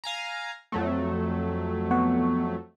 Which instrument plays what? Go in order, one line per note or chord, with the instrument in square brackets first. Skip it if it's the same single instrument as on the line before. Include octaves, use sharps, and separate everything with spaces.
[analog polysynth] F5 G#5 A#5
F2 F#3 A3
[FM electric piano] B3 F#5 C#6